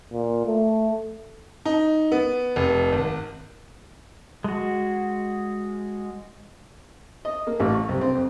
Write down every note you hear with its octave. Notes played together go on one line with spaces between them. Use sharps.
A#2
A3
D#4
B3
F1
G#1
G#3 F#4
D#5
A#3
A1
C#6
C2
C4
F2